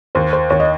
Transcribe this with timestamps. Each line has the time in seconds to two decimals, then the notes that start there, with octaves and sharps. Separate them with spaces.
0.15 D#2 C5
0.33 C5
0.50 D#2 C#5
0.60 D#5